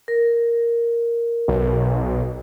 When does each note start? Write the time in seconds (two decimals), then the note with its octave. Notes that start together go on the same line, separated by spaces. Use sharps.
0.08 A#4
1.48 B1